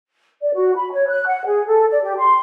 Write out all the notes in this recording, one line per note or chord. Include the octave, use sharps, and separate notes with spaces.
D5
F#4
B5
C#5
F#6
F#5
G#4
A4
D5
G4
C6